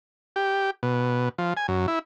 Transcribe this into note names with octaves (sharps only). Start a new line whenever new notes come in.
G4
B2
F3
G#5
F#2
E4